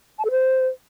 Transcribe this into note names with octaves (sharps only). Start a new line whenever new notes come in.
A5
A4
C5